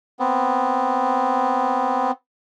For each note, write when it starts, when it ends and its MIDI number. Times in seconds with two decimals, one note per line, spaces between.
0.20 2.11 59
0.20 2.11 60